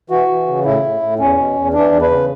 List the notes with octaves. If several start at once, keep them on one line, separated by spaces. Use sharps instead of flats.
E3 F#4
E3
C#3
A2 E4
A2
A2
E2 C#4
B2
E2
E3 D4
E2
B4
C#3